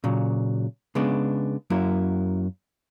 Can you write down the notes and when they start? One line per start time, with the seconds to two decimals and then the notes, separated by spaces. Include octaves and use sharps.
0.04 A#2 C#3 F#3
0.95 C#3 G#3 B3 D4
1.70 F#2 F#3 A#3 E4